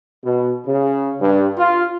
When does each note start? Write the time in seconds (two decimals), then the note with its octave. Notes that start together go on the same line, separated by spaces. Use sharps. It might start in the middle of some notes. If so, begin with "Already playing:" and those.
0.24 B2
0.67 C#3
1.21 G2
1.58 F4